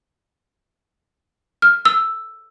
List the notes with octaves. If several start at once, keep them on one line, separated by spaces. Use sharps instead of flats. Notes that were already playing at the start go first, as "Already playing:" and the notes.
F6
E6